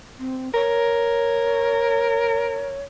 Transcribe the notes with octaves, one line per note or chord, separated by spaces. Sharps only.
C4
A#4 C#5